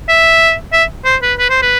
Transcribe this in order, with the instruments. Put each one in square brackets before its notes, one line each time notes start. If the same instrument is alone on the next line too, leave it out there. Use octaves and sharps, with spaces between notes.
[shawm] E5
E5
C5
B4
B4
C5
B4